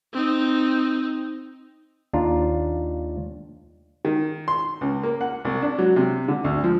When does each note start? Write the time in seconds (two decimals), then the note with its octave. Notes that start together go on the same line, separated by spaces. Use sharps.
0.13 C4 D#4
2.13 D#2 D4 F4 A#5
4.05 D#3
4.48 C6
4.81 C#2
5.03 A#3
5.21 F#5
5.45 C2
5.62 D4
5.79 F#3
5.96 C3
6.28 D3
6.44 D2
6.64 F3